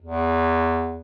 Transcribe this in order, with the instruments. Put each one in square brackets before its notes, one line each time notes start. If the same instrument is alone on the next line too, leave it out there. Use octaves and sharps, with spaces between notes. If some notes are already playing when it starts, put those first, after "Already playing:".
[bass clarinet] E2